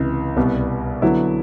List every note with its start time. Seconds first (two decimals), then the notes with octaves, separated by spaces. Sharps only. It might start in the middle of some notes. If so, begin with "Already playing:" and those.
Already playing: C#2 C3 E3
0.36 C2 B2 G3 B3
1.02 D3 F#3 B3 E4